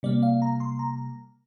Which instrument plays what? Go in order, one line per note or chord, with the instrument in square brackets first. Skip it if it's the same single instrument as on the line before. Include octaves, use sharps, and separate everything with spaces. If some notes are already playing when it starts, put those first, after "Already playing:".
[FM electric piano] C3 G3 A#3 D5
F5
A#5
C6
A#5